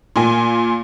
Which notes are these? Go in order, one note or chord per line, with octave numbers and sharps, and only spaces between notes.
A#2 A#3 G#5